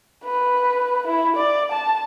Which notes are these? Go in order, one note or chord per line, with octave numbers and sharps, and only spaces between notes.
B4
E4
D5
A5